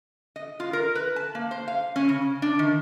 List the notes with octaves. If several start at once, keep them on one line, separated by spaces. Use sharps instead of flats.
D#5
F4
A#4
B4
A5
A#3
C5
F5
C#4
C#3
D4
D#3